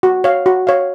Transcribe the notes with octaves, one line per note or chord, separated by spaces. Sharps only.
F#4
C#5 F5
F#4
C#5 F5